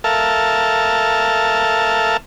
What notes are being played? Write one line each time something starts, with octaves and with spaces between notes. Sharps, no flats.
A4 A#4 E5 F5 A5